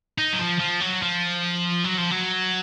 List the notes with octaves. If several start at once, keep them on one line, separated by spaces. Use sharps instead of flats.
D#4
F#3
F3
F3
F#3
F3
F#3
F3
F#3